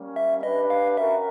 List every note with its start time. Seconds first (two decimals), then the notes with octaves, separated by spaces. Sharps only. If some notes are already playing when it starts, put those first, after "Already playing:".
Already playing: G3 A#3 C#4
0.16 E5
0.43 D4 G4 B4 D#5
0.70 F5
0.97 C#4 F#4 A#4 E5